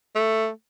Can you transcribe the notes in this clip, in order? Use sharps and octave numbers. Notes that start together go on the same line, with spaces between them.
A3